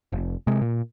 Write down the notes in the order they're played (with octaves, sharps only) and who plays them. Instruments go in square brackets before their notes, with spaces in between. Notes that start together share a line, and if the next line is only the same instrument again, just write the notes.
[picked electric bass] F1
C3 G#3
A#2